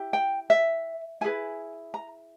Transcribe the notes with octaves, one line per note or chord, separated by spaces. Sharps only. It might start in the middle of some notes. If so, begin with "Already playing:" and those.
Already playing: E4 G4
G5
E5
E4 G#4 B4 G#5
A#5